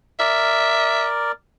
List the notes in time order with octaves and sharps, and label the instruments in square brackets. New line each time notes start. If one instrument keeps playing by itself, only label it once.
[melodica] A#4 D5 [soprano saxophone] E5